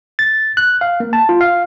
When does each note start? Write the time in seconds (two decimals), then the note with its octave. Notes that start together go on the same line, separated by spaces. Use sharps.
0.19 A6
0.57 F#6
0.81 F5
1.00 A#3
1.13 A5
1.29 F4
1.41 F5